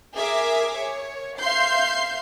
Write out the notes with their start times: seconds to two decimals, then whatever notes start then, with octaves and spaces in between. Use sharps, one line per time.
0.15 G#4 A#4 E5 D6
0.79 C#5
1.40 E5 F5 C6 G6 C7